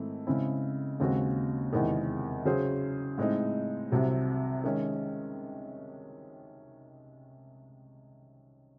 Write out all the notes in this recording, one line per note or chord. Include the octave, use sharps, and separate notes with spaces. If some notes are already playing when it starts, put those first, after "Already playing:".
Already playing: G#2 D#3 A3 C4 E4
C#3 G#3 C4 E4
D#2 C#3 G#3 C4 F#4
E2 C3 D#3 G#3 D#4
C#3 F#3 C#4 G#4 C5
A2 G#3 C4 D#4
C2 C3 F#3
D#3 G#3 C#4